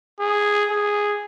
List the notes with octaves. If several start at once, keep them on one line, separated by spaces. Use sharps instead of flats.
G#4
G#4